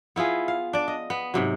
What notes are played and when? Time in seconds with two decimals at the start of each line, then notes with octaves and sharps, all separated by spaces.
0.16 B3 E4 F4 G#4
0.48 F5
0.73 D4 D5
0.88 D#5
1.10 B3
1.34 G#2 C3 F#3